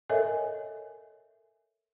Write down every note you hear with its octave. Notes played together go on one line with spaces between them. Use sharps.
A4 A#4 C#5 D#5 E5 G#5